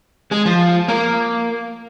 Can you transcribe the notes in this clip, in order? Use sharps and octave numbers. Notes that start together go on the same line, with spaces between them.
G#3 G#4
F3 F4
A#3 A#4